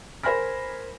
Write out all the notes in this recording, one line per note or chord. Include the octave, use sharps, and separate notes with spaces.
A#4 C5 G#5 B5 F6 A#6